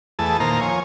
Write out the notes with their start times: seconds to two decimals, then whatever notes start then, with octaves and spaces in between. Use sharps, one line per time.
0.19 E2 A3 G#4 A5
0.40 A#2 D#3 A#3 C5 A#5
0.61 F3 C#5 G#5